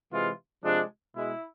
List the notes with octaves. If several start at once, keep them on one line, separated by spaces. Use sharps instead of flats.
C3 E3 G#3 F4
C3 F3 G#3 D4
B2 G#3 E4